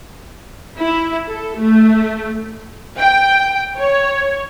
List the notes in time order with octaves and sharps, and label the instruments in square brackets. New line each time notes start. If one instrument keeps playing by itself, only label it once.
[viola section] E4
A4
A3
[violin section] G5
C#5